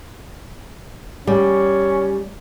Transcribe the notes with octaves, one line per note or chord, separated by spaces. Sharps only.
G3 C#4